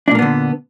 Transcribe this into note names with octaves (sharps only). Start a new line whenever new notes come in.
A#2 D3 A#3 B3 D4